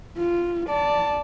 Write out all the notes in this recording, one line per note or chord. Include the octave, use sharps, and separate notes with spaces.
F4
D5 A5